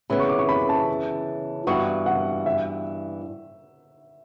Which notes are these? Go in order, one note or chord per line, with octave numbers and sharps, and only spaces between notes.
C#3 E3 B3 B5
C#6
D6
C#6
B5
A5
G2 E3 B3 F#4 C#6
F#5
E5